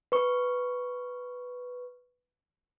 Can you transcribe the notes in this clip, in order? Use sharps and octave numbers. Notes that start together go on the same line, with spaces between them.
B4 C#6